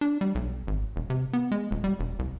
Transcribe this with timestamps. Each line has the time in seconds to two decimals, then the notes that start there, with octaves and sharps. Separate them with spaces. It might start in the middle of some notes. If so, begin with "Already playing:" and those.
0.01 D4
0.21 G3
0.35 B1
0.67 G#1
0.96 E1
1.10 C3
1.33 B3
1.52 G#3
1.71 D#1
1.84 G3
1.99 E1
2.19 C2